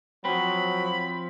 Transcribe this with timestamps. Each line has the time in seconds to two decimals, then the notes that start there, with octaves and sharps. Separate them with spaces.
0.25 F3 F#3 C4 B5